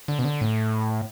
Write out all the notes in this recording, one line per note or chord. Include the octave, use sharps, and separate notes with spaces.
D3
B2
D3
A2